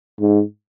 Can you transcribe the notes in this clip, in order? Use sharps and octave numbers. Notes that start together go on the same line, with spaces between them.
G#2